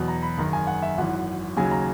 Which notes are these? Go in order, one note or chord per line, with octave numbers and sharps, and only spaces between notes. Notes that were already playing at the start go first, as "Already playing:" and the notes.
Already playing: E2 B2 F#3
A#5
B5
F#1 F#2 D#3 A#5
G#5
F#5
E5
G#1 F#2 E3 F#5
D#2 C#3 F#3 G#5
A#5